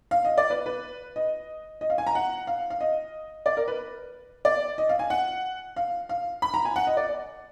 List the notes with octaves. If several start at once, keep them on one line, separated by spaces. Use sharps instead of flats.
F5
D#5
D5
B4
B4
D#5
D#5
F5
G#5
A#5
F#5
F5
F5
D#5
D5
A#4
B4
D5
D#5
F5
G#5
F#5
F5
F5
B5
A#5
G#5
F#5
D#5
D5